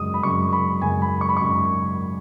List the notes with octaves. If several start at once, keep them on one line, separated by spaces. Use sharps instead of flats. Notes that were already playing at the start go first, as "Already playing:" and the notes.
Already playing: F#2 C#3 G#3 D#6
B5
F#2 C#3 G#3 C#6
B5
F#2 C#3 G#3 G#5
B5
C#6
B5
F#2 C#3 G#3 C#6